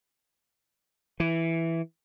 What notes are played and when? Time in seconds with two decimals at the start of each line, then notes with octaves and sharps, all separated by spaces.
1.20 E3